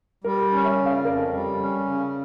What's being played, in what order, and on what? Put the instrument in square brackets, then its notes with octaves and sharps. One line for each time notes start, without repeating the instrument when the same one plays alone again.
[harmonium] G3 [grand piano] A#4
[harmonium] C#4
[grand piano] C#5 E5
[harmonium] C#3
[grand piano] D5 F5
[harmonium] F2 [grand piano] A#4 D5
[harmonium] G3
C#4
C#3